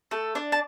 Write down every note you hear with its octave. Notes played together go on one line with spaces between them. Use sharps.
A3 A4
D4 D5
A5